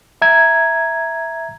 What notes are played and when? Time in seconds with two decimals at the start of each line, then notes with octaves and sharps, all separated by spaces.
0.22 E5 A#5 G#6